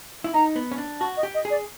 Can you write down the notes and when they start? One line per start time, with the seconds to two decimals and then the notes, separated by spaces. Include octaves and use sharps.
0.24 E4
0.34 D#4 A#5
0.56 B3
0.71 C#4
0.78 D4
1.00 F#4 A5
1.17 D#5
1.23 G4
1.35 D#5
1.45 G#4
1.50 D5